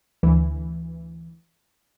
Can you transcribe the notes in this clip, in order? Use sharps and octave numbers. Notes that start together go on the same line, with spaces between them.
D2 E3